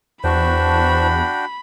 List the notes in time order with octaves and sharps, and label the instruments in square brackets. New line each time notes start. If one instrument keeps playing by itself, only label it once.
[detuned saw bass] E2 [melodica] D4 F#4 G5 [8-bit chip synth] C5 A5 C#6 [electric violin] B5